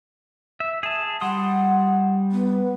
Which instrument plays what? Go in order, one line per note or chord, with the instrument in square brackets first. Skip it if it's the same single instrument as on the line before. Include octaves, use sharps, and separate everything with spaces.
[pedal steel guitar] E5
G#4 A5
[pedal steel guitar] G3 C6 D#6 [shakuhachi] F#5
[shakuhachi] B3